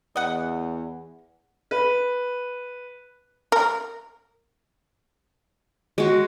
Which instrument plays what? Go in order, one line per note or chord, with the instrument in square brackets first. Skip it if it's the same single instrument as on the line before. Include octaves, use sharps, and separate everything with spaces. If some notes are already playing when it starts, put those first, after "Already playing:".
[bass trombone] E2 [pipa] D#5 F#5
[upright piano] B4
[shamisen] A#4
[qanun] G#3 F#4